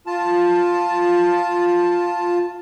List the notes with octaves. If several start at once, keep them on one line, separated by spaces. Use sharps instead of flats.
F4 A5